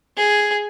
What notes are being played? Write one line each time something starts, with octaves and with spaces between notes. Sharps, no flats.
G#4